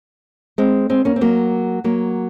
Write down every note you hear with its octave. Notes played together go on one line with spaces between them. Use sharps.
G#3 C4
G#3 C4
A#3 C#4
C4
F#3 A#3
F#3 A#3